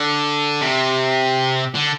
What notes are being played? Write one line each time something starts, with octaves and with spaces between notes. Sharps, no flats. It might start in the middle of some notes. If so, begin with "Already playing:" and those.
Already playing: D3
C3
D3